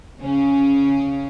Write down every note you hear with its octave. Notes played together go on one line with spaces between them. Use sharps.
C#3 C#4